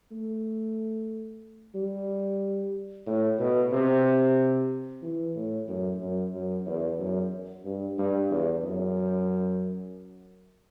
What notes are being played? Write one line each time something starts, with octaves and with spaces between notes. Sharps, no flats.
A3
G3
A2
B2
C3
E3
A2
F#2
F#2
F#2
E2
F#2
G2
G2
E2
F#2